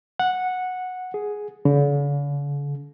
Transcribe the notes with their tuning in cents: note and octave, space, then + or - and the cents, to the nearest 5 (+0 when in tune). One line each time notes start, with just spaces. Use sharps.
F#5 -10
G#4 +5
D3 -45